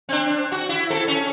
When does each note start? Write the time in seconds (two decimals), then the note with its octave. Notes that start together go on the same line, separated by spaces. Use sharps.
0.09 C4 D4
0.52 F#4
0.69 E4
0.90 C4 A4
1.08 C#4